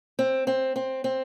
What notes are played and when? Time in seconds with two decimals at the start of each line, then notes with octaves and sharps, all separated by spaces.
0.19 C4
0.47 C4
0.76 C4
1.04 C4